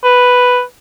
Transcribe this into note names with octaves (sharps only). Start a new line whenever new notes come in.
B4